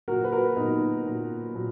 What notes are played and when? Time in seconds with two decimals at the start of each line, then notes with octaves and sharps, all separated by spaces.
0.08 A#2 F#3 F#4 A#4
0.24 B4
0.32 F#4 A#4
0.56 A#2 F#3 B3 D#4
1.06 A#2 F#3
1.55 A#2 F#3